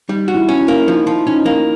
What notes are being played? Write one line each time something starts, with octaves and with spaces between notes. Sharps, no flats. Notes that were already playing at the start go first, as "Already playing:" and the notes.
G3 D#4
F#4
E4
C#4
E4
A#3
F3 D#4
F3
C#4 D#4
A#3